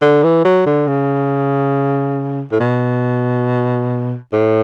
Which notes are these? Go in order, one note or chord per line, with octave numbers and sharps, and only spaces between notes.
D3
E3
F#3
D3
C#3
A2
B2
A2